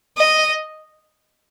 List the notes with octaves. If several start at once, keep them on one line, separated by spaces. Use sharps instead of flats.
D#5